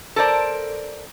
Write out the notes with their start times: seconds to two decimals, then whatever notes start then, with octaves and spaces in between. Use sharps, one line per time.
0.16 A4 A#4 C5 D5